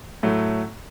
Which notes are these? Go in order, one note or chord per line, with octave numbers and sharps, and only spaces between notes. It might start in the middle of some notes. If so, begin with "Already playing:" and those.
A2 F#3 A3